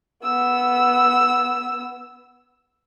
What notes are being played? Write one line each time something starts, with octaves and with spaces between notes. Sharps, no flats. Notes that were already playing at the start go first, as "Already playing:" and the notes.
B3 E6